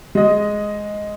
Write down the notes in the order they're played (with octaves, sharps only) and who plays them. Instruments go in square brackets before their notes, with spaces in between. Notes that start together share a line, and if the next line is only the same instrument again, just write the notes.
[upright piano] G#3 D#5